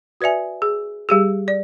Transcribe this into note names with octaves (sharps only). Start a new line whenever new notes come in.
F#4 B4 D5 E5 G#5
G#4
G3 G4 G#4
D5